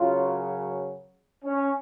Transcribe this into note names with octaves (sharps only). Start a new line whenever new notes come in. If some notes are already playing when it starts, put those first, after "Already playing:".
Already playing: F#2 C#3 F#3 F4
C#4